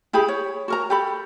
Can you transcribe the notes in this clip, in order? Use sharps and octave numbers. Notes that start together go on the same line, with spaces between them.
E4 G4 G#4 B5
C#5
F#4 A#4 A#5
G4 A4 B5